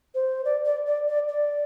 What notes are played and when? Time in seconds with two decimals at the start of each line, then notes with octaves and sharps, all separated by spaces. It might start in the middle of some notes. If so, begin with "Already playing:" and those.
0.15 C5
0.45 D5
0.65 D5
0.87 D5
1.08 D5
1.28 D5